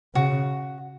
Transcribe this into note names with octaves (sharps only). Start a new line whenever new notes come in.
C#3 F#4